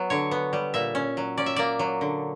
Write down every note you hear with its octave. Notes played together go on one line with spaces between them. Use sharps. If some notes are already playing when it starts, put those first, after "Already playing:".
Already playing: F#3 B3
D3 C#5
B3
G3
A#2 E5
C#4
F#3
C#4 D5
E5
A#3 D5
F#3
D3